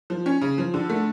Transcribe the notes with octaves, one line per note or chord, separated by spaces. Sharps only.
F3
C#4
C#3
F3
D3
A3